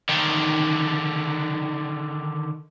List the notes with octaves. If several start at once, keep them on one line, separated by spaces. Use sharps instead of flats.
D3 D#3